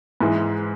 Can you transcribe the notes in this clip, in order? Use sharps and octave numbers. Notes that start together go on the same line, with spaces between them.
G#2 E3 G#3